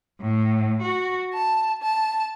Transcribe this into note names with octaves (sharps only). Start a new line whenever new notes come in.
A2
F#4
A5
A5